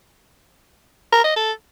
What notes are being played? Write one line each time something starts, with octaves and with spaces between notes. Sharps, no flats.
A#4
D#5
A4